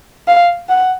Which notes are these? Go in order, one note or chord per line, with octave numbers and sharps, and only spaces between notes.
F5
F#5